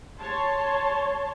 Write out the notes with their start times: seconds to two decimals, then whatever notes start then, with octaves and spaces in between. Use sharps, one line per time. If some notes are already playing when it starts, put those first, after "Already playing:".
0.20 C#5 A5 C6